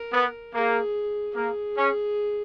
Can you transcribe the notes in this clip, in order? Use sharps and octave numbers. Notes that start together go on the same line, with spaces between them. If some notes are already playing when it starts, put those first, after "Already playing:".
Already playing: A#4
B3
A#3 G#4
A#3 G#4
C#4